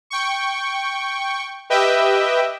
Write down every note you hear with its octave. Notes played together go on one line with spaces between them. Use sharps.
G5 C#6
G4 B4 D#5 E5 G5